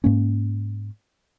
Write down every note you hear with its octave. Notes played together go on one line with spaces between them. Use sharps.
G#2 A#3 C#4